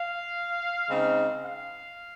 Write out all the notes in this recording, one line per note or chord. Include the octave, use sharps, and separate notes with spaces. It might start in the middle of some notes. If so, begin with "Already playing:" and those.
Already playing: F5
C#3 G#3 C4 D#4
F5